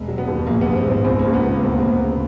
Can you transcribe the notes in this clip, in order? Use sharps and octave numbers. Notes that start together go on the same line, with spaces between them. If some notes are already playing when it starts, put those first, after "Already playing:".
Already playing: E1
F#3
B3
D#2
A#1 A#3
B3
A#1
C4
G#2
C4
C#2 C4
A#3
C#2
B3
C#3 A#3
D2 C4
B3
D2 A#3
B3
C#3